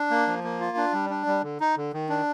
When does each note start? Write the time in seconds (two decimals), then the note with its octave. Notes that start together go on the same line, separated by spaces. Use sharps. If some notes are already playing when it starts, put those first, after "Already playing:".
Already playing: D4
0.11 A#3
0.27 F3
0.44 A#3
0.60 F4
0.77 D4
0.93 G3
1.10 D4
1.26 G3
1.43 D3
1.60 D#4
1.77 D3
1.93 D#3
2.09 D4